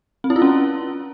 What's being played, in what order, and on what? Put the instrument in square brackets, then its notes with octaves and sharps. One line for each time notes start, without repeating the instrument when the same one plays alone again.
[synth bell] C4
E4
F4
C#4